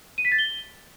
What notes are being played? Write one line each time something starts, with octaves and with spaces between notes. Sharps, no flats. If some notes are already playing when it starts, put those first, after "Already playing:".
D#7
B6
A6
G7